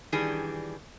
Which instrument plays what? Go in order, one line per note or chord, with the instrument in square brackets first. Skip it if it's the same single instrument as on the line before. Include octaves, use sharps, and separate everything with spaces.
[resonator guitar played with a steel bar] D#3 E3 G3 D4 G#4